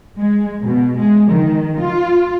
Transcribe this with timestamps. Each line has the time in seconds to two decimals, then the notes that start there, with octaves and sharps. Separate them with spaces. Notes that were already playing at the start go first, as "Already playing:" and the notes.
0.17 G#3
0.62 B2
0.97 G#3
1.31 D#3
1.79 F4